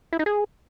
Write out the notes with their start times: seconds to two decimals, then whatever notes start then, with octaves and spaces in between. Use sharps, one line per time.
0.13 E4
0.19 D#4
0.26 G#4